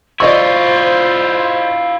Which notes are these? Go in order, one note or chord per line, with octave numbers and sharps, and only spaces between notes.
E4 F4 C5 D5 D#5 C#6